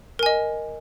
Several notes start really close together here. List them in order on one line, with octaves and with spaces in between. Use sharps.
A#4 G#5 D#5